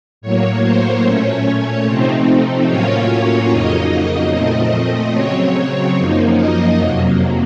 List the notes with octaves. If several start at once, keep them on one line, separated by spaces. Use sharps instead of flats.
A2 F#3 A#3 C#5
C5
A#2 A3 C#4 C#5
C3 F3 A3 C4 D#4
A2 F#3 A#3 C#4 F4 C#5
F2 C#3 F#3 A#3 D#4 D#5
A#2 F3 A3 C4 D#5
C#3 F#3 C4 C#5
F#2 F3 A#3 D#4
D#5
F2 C3 F#3 A#3